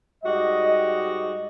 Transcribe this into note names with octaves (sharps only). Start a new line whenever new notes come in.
G#2 G3 F#4 D#5